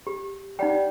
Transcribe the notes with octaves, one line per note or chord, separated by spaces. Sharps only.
G4
G3 D#4 F#5 G5